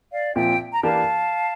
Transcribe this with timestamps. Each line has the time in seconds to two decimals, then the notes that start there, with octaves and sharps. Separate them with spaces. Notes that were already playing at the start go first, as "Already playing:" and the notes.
0.12 D5 F5
0.35 A#2 F3 C4 F4 E5 G5
0.72 A#5
0.83 E3 A#3 D4 G4 F5 A5